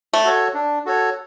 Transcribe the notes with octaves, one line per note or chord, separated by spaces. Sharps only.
A3
F#4 A4 C#5
D4
F#4 A4 C#5